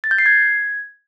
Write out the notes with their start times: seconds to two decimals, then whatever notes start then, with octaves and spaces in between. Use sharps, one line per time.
0.04 A6
0.11 G6
0.18 C7
0.26 G#6